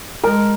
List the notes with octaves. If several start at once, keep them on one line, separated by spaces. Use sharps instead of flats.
G#3 A#4